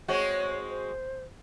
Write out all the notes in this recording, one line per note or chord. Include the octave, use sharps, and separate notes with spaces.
G#3 C4 F#4 C#5
C5